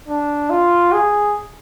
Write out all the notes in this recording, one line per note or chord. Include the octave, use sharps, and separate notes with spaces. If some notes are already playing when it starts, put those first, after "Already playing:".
D4
F4
G#4